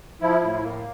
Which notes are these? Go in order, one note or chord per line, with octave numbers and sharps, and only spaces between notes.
F3 E4
A2
A#3